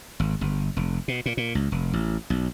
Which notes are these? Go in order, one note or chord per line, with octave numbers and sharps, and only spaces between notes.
G#1
G1
F1
B2
A#2
A#2
C#2
F1
A1
B1